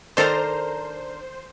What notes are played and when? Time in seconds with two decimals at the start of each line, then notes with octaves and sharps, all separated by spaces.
0.17 D#3 D4 A4 A#4 C5 A#5